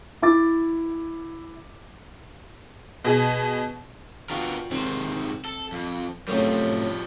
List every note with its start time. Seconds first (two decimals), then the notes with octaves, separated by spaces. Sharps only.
0.22 E4 D6 A6
3.04 B2 G#4
4.30 B3 D4 F4 F#4 A#4 G5
4.71 G#2 C3 D#3 C4 C5
5.45 A4
5.72 F2
6.28 F#2 A2 C3 F3 G3